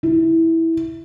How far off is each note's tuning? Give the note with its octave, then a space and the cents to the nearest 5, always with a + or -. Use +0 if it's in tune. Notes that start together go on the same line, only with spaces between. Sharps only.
E4 -10